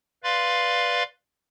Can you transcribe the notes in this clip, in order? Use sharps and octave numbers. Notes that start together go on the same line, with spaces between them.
B4 D5 F5 C6